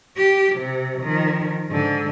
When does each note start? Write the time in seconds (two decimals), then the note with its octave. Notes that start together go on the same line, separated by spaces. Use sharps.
0.17 G4
0.56 C3
1.02 D#3 F3
1.70 G#2 D3